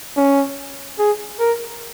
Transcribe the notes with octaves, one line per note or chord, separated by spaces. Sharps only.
C#4
G#4
A#4